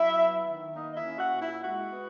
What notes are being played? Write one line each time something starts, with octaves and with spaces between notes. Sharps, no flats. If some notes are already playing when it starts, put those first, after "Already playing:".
Already playing: F#3 E4 E5
B3
D#3
A#3 D#4 D#5
D#5
E4 E5
C#4
F#4 F#5
A#2
E4 E5
G#3 F#4 F#5
B3